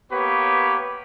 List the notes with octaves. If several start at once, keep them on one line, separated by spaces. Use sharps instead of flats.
A#3 B3 G4 B4 C#5